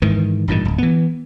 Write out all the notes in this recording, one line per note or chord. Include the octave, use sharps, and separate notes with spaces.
G#2 D#3 E3
A1 G2 A#2 D#3
D1
E3 B3